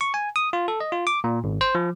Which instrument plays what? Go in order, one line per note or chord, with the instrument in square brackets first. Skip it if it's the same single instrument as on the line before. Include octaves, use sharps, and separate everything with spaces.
[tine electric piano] C#6
G#5
D#6
F4
A4
D#5
F4
D6
A#2
G#1
C5
F3